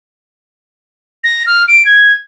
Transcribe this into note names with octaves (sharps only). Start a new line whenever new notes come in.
A#6
F6
D7
G#6